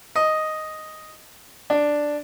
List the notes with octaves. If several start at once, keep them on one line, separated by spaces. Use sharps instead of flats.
D#5
D4